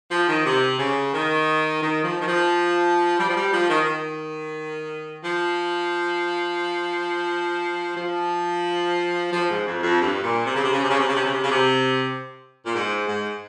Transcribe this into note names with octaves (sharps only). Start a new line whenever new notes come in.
F3
D#3
C3
C#3
D#3
D#3
F3
D#3
F3
G3
F3
G3
F3
D#3
D#3
F3
F3
F3
G#2
F2
F2
G2
A#2
C3
C#3
C3
C#3
C3
C#3
C3
C#3
C3
C#3
C3
C#3
C3
A#2
G#2
G#2